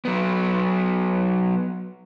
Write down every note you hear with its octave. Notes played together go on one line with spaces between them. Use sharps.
F#3 B3